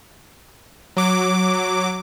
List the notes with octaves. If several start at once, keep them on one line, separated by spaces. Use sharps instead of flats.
F#3 D6